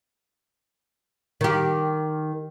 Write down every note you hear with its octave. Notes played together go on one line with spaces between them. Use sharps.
D#3 G4